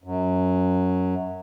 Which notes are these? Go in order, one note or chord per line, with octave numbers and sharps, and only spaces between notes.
F#2